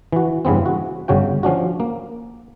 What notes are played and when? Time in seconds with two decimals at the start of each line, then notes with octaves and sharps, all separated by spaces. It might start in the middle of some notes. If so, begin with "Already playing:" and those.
0.13 E3 F#4
0.45 G2 C#3 E3 B3 C4
0.66 F#4
1.08 G1 C#3 C#4 F#4 G5
1.43 F3 C#4 D4 F#4
1.80 A#3